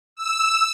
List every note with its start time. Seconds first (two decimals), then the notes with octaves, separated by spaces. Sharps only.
0.16 E6